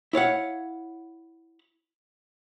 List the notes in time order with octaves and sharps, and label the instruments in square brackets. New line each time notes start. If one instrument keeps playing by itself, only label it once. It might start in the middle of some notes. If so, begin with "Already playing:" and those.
[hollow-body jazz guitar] E4 C#5 F5 F#5